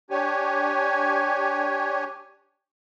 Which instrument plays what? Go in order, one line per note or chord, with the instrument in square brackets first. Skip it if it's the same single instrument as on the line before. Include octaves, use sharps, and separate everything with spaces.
[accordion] D4 G4 C#5 G#5